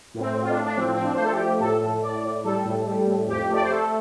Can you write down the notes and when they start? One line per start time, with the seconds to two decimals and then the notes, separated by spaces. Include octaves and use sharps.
0.14 A2
0.20 C4
0.35 A2
0.42 F4
0.49 D4
0.56 A2
0.66 D4
0.77 F3 C4
0.94 F3 C4
1.04 D4
1.15 C5
1.19 A3 A4
1.32 G4
1.39 F3
1.60 A2 A4
1.81 A2
2.02 A2 D5
2.23 A2
2.44 G3 A4
2.65 A2
2.87 G3
3.07 A2
3.28 F2 G4
3.48 A3
3.54 D5
3.62 C5
3.70 A3 A4